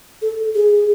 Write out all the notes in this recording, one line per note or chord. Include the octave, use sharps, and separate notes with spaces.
A4
G#4